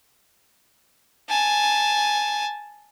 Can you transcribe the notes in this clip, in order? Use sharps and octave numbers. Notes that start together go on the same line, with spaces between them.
G#5 A5